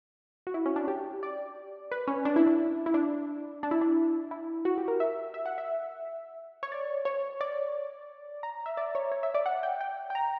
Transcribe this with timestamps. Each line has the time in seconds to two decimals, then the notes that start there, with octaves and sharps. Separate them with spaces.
0.47 F#4
0.54 E4
0.66 C#4
0.76 D4
0.88 G4
1.23 D5
1.92 B4
2.07 C#4
2.25 D4
2.36 E4
2.46 D4
2.86 E4
2.94 D4
3.63 D4
3.71 E4
3.81 D4
4.31 E4
4.65 F#4
4.78 G4
4.88 A#4
5.00 E5
5.34 E5
5.46 F#5
5.58 E5
6.63 C#5
6.72 D5
7.05 C#5
7.41 D5
8.43 A#5
8.66 E5
8.77 D5
8.95 C#5
9.12 C#5
9.23 E5
9.34 D5
9.46 F#5
9.63 G5
9.81 G5
10.10 G5
10.15 A#5